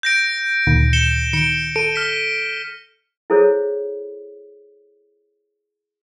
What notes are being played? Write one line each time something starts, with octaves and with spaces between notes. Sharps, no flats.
G6 A#6 D7
D2 A#2 D#3
C#7 E7 G7
D#3 C#7 D7
A4 D7 D#7
F6 B6
E4 G#4 A4 C5 C#5